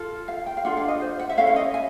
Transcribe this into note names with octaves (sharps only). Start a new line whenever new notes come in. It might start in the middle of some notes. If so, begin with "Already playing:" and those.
Already playing: F4 A4
F5
G5
F5
D4 F4 A4 F#5
F5
D#5
C5
F#5
E5
C#4 E4 A4 F5
C#5
D#5
G#5